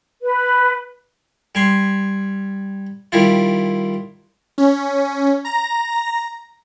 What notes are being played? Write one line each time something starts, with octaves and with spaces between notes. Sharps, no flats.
B4
G3 G#5 C6
D#3 G3 E4 F4
C#4
A#5 A#6